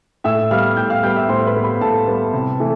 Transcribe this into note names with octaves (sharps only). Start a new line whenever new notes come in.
A2 E5 E6
G3 B3 F5 F6
A2 G5 G6
F5 F6
G3 B3 G5 G6
E5 E6
A2 C5 C6
B4 B5
G3 B3
B4 B5
A2 A4 A5
G3 B3
C3
E3 A3